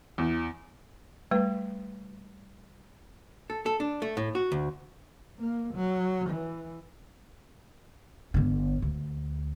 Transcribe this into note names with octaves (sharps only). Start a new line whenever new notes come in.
E2
G3 A3 B4
A4
A4
D4
A3
A2
F#4
D2
A#3
F#3
E3
G1 D3
D2